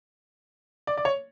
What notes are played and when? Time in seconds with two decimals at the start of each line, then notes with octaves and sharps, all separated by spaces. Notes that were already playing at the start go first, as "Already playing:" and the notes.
0.87 D5
0.97 D5
1.05 C#5